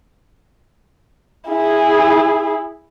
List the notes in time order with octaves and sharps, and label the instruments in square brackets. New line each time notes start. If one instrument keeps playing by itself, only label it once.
[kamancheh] E4 G#4